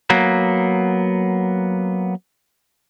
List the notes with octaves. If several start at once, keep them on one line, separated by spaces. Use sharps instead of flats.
F#3 A#3 B3